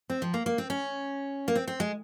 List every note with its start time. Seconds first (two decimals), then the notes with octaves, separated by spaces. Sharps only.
0.10 C4
0.22 F3
0.34 A#3
0.46 A#3
0.58 C4
0.70 C#4
1.48 A#3
1.56 C4
1.68 C4
1.80 G#3